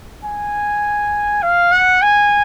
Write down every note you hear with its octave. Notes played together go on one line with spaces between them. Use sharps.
G#5
F5
F#5
G#5